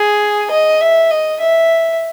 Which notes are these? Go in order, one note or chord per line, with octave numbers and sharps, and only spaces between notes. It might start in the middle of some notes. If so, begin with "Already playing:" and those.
Already playing: G#4
D#5
E5
D#5
E5